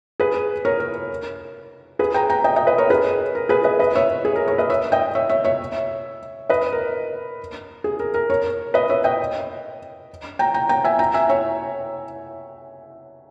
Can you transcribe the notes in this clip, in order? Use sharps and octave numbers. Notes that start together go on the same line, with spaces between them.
G#4 B4
A#4 C#5
A#4
G#4 B4
G5 A#5
G5 A#5
D#5 G5
D#5 G5
B4 D#5
A#4 C#5
G#4 B4
A#4
G#4 B4
B4 D#5
B4 D#5
C#5 E5
G#4
A#4
A#4 C#5
B4 D#5
C#5 E5
D#5 G5
C#5 E5
C#5 E5
C#5 E5
B4 D#5
A#4
G#4
A#4
A#4
A#4 C#5
B4 D#5
C#5 E5
D#5 G5
G5 A#5
G5 A#5
G5 A#5
E5 G#5
G5 A#5
E5 G#5
C#5 E5